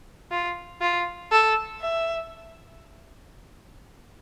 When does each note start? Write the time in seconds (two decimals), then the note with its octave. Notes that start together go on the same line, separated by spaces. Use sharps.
0.31 F4
0.81 F4
1.32 A4
1.81 E5